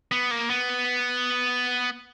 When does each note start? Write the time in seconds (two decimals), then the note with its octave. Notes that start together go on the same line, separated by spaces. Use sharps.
0.12 B3
0.31 A#3
0.50 B3